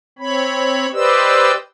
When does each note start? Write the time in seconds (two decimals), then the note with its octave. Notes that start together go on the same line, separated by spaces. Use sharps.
0.19 C4 C#5 B5
0.93 G4 B4 C5 D5 D#5 E6